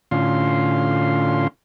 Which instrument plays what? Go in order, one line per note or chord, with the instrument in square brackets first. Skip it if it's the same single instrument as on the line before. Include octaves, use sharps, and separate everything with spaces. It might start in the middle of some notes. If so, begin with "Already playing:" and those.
[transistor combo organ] A2 D3 C#4 F4 F5 C6